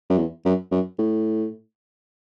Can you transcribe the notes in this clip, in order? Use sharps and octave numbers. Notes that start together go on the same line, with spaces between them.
F#2
E2
F#2
F#2
A2